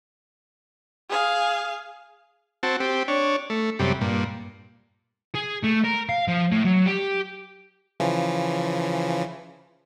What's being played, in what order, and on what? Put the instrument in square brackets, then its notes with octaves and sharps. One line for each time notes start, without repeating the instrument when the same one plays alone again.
[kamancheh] G#4 F5
[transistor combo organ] C4 F#4 A5
C4 G4
D4 C#5
A3
F#2 C3 G3
G2 A#2
[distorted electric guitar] G#4
A3
A#4
F5
F3
A2
F#3
G4
[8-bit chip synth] C#3 E3 F3